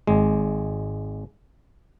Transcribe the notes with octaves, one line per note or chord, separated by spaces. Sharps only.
G#1 G#3